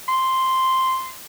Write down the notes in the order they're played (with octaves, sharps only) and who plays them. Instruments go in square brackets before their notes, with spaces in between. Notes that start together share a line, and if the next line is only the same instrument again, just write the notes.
[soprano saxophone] C6